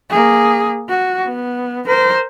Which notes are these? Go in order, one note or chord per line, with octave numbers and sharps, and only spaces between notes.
A#3 G#4
F#4
B3
A#4 C5